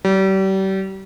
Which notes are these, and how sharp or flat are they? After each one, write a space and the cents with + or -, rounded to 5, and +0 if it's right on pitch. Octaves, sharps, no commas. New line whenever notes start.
G3 -35